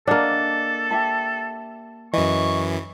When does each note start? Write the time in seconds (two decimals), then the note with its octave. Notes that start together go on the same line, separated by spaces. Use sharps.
0.07 A#3 D4 G#4 A4 D#5 F#5
0.91 G4 E5 A5
2.13 F#2 E3 D#5 C#6